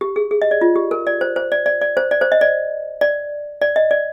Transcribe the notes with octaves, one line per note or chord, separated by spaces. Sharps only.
G4
G#4
G#4
D#5
D5
F4
G4
A#4
D5
C5
C5
D5
D5
D5
C5
D5
C5
D#5
D5
D5
D5
D#5
D5